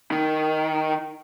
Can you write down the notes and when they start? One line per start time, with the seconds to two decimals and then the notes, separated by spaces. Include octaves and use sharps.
0.12 D#3